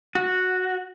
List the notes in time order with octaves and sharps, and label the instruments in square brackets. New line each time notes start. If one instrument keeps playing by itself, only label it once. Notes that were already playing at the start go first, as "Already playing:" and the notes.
[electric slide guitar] F#4